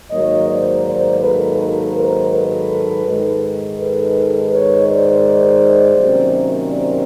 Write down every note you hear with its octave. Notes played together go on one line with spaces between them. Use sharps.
G#2 D#3 F#3 A#3 C#5 D#5
C5 D5
C5 D5
A4 B4
A4 B4
A#4 C5
A4 B4
G#2 D#3 G#3
A4 B4
B4 C#5
C5 D5
C3 D#3 F#3 A#3 C#4
C5 D5